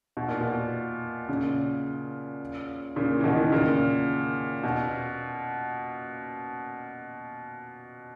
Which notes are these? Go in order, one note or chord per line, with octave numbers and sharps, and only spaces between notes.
B2
A#2
B2
A#2 C#3
A#2 C#3
E3
B2 D#3
A#2 C#3
B2